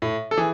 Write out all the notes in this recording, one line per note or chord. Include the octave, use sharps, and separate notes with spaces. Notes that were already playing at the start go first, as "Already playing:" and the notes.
A2
A4
E3 G#4